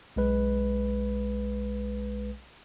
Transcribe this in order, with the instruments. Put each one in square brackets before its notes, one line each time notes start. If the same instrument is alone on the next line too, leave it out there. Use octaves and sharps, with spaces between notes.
[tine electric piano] B1 G#3 B4